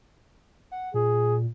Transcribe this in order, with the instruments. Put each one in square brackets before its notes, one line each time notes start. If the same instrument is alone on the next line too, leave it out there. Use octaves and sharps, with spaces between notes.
[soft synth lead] F#5
[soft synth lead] A#2 [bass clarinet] G#4